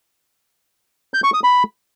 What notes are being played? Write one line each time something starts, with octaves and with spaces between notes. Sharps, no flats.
G6
C#6
D#6
B5